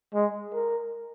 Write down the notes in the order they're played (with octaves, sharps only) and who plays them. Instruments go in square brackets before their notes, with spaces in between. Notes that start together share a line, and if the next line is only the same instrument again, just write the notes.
[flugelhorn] G#3
A#4